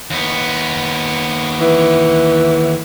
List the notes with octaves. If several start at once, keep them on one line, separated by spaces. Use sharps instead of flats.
D#2 B3
E3